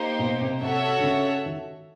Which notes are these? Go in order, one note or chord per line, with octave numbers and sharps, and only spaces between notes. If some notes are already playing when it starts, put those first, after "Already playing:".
Already playing: A#3 D#4 G4 C5
B2
C3
C3 F#4 A4 C#5 E5
D3
C#3
D#3